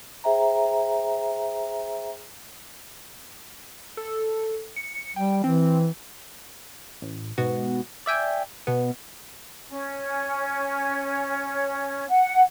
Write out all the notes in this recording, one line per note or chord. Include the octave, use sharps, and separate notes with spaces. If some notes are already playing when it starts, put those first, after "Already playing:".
G#4 C5 E5 G5 A#5
A4
C#7
G3 G5
E3 C4
A1
G#2 B2 B3 F#4
D5 E5 G5 G#5
B2 B3
C#4
F#5